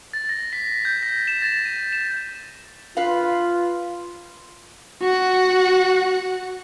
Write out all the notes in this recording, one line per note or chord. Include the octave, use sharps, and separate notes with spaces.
A6
A#6
B6
G6
A#6
E7
A6
D#7
E7
F4 B4 F5
F#4 F#5